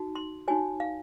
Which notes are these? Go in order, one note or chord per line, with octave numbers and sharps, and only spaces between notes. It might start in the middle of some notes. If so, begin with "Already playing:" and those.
Already playing: D#4 F#4
C6
D#4 F#4 C#5 G#5
F5